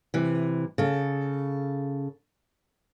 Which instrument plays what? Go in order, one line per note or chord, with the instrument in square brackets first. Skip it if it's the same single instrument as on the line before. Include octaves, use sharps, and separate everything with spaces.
[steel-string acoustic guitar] C3 E3
C#3 A4